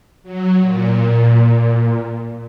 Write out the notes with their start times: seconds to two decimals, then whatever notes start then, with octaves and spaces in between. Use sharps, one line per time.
0.23 F#3
0.60 A#2